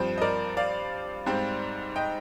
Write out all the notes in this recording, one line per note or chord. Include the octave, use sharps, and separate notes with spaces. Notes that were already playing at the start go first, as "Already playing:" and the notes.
Already playing: G2 F3 C4
D#5
A#4 D5
D5 F5
G#2 G3 C4
D#5 G5